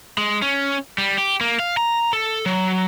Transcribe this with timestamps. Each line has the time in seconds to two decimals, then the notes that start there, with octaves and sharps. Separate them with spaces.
0.18 G#3
0.42 C#4
0.98 G3
1.18 G4
1.41 A#3
1.59 F5
1.77 A#5
2.13 A4
2.46 F#3